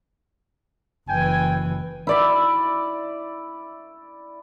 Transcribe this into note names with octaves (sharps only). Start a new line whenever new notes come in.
F#1 E3 G5 G#5
E4 D5 E5